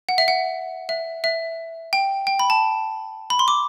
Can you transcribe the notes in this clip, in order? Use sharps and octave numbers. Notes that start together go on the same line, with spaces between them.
F#5
E5
F#5
E5
E5
G5
G5
B5
A5
B5
C6
D6